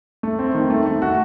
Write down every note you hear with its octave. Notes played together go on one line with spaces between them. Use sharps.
A3
C4
D#3
A3
A3
F#4